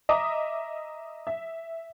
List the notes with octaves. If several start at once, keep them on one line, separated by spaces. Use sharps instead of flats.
D#5 E5 A#5 D6 D#6
E5